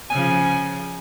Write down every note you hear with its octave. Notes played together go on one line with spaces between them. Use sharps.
C#3 F3 G#5